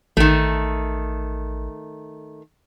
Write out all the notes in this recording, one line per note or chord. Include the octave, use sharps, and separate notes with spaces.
A1 D#3 A3